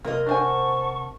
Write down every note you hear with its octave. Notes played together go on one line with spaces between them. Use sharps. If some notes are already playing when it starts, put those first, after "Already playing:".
C3 A#3 A#4 D#5
D4 C5 F#5 G#5 A5 C#6